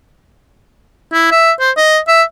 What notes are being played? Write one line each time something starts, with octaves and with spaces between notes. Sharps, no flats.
E4
E5
C5
D#5
E5